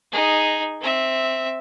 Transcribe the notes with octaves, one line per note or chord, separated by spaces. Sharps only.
D#4 G#4
C4 E5